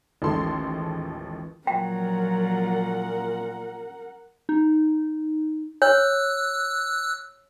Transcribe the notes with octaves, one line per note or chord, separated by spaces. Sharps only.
A1 D#2 F3 G#3 A4 C6
A#2 F3 F#3 A#4 F#5 G5
D#4
C#5 E6 F#6